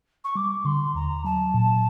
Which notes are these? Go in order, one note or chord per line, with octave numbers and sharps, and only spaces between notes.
C#6
G3 D6
D3 C6
D#2 A#5
F#3 A5
A#2